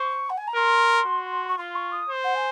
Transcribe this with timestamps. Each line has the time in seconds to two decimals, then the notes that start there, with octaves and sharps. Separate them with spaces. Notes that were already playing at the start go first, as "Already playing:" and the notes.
Already playing: C5 C#6
0.29 F#5
0.37 G#5
0.47 A#5
0.55 A#4 C6
1.06 F#4
1.47 C#6
1.57 F4 C6
1.74 C#6
1.91 D#6
2.09 C5
2.23 F#5
2.35 G#5